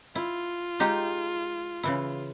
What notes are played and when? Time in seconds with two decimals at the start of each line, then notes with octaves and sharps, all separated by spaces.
0.15 E4 F4
0.80 G#3 D#4 G4
1.83 C#3 E3 E4